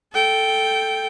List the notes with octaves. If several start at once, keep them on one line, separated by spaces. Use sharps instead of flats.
A4 G5